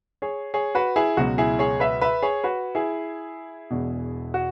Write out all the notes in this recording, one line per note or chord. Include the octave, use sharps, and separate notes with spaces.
G#4 C#5
G#4 C#5
F#4 B4
E4 G#4
C#2 B2 F#3 F#4
E4 G#4
G#4 C#5
B4 E5
B4 E5
G#4 C#5
F#4 B4
E4 G#4
E1 E2 B2
F#4